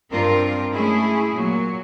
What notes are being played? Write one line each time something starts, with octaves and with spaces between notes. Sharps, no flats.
G2 C4 D4 F4 A#4
G#3 A3 C#4 E4 G#4
A#2 F#3